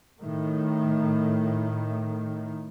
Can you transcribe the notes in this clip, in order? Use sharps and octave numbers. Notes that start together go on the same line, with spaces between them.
A2 D#3